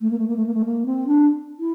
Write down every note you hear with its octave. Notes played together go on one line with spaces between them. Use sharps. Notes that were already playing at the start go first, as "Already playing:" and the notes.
A3
A#3
A3
A#3
A3
A#3
A3
A#3
C4
D4
E4